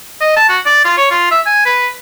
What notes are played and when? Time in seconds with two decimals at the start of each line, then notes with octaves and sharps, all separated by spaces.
0.21 D#5
0.37 A5
0.49 F#4
0.66 D5
0.85 F4
0.98 C#5
1.11 F4
1.31 E5
1.46 G#5
1.66 B4